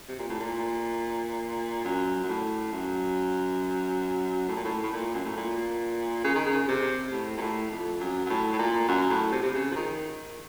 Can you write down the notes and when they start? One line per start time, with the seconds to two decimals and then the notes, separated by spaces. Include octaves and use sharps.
0.08 C3
0.19 A#2
0.29 A2
0.40 A#2
1.85 F#2
2.23 F#2
2.29 A2
2.72 F#2
4.48 A2
4.56 A#2
4.65 A2
4.83 A2
4.92 A#2
5.14 F#2
5.25 A2
5.37 A#2
6.24 C#3
6.35 D#3
6.46 C#3
6.68 C3
7.12 A2
7.37 A#2
7.41 A2
7.71 F2
8.00 F#2
8.25 F#2
8.30 A2
8.52 A2
8.59 A#2
8.88 F#2
9.09 A2
9.32 C3
9.43 C3
9.54 C#3
9.72 F3
9.76 D#3